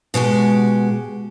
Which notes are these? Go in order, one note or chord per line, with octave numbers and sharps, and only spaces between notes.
B2 G#3 F#4 G4